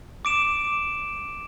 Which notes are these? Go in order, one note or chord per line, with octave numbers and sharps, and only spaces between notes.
D6 D7 E7